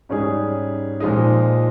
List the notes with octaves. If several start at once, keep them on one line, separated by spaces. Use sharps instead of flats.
G#2 G3 C#4 G#4
A#2 F3 G#3 D#4